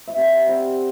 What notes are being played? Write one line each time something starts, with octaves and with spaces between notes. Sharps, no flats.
E5
C3 F#5
G3 C4